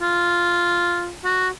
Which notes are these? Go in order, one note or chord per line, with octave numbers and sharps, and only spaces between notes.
F4
F#4